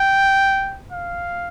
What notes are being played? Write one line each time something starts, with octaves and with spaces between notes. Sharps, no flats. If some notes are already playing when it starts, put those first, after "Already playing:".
Already playing: G5
F5